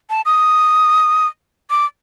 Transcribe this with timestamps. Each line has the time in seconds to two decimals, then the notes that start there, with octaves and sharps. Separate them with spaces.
0.10 A5
0.26 D#6
1.70 D6